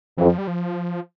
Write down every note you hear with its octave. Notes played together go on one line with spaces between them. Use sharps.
F2 E3
F3
G3
F3